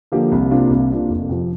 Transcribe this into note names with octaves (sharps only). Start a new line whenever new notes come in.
D3 F3 A#3 G4
C2
C3 A#3 D4 F4
C2
C3 A#3 D4 F4
F1
F2 C3 F3 C4